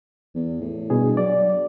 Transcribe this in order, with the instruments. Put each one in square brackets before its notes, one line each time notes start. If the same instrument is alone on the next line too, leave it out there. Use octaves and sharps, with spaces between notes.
[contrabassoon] E2
A2
[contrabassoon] G2 [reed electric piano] B2 G#4
[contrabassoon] F#3 [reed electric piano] D5